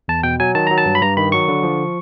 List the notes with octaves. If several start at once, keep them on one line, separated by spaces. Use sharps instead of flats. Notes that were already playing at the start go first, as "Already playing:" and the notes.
E2 A5
B2 G5
F#3 G#5
D#3 A5
F#3 A#5
A5
G2
B5
G2 A#5
D#3 B5
F#3 C#6
D3
F3